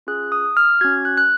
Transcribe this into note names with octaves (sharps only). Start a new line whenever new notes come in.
C#4 F4 G#4 F#6
D#6
F6
C#4 F#4 G#6
F#6
F#6